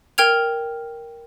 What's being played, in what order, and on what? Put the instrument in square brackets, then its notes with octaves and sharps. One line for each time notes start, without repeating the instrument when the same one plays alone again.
[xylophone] A#4 G5 F6 G#6 F7